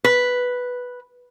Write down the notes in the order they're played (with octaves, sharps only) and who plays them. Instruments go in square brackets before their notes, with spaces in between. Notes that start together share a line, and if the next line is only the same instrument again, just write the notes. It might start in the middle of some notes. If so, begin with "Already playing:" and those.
[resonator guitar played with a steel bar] B4